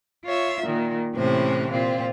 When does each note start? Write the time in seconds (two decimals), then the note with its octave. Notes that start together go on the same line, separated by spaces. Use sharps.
0.25 F4 C#5 E5
0.64 A#2 D#3
1.14 A2 C3 E3 C#4 C5
1.70 A#2 C4 F4